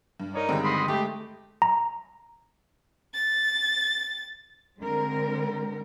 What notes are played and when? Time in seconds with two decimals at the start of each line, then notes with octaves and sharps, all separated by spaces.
0.20 G2
0.34 D#4 A#4 C#5 D5
0.49 G2 D3 D#3 G#3 C4
0.64 D#5 B5 C6
0.88 G#3 A3 G4 G5
1.62 A#5
3.14 A6
4.81 D3 G#3 C4 A#4